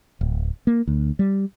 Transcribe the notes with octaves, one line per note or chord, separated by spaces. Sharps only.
D1
A#3
D2
G3